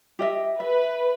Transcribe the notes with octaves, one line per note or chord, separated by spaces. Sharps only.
G4 D#5 E5
B4 E5